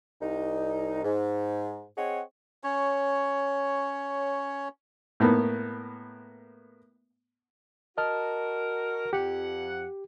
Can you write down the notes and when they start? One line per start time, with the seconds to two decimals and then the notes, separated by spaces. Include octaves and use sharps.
0.21 C2 D#4
1.04 G#2
1.97 C4 G#4 C#5 D#5 F#5
2.64 C#4 C#5
5.20 A2 A#3 B3
7.98 F#4 A#4 D#5 A5 F6
9.13 F2 G4 F#5